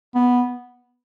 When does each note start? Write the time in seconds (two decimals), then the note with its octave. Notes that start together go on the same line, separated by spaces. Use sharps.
0.15 B3